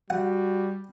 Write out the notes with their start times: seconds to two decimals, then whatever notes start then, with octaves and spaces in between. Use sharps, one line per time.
0.10 G3 F#4 F#5